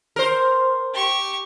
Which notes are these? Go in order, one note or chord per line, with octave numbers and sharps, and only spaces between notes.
A#4 C5
G4 C#6